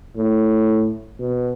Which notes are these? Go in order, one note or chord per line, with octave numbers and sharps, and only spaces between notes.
A2
B2